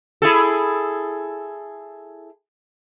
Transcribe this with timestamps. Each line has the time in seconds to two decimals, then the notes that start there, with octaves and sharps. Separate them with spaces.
0.22 E4 G#4 A4